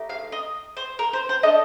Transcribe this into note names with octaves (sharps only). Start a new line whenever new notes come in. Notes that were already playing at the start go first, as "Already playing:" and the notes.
Already playing: A3 D#4 G4
F5
D#5
C5
A#4
C5
C5
D4 A4 D#5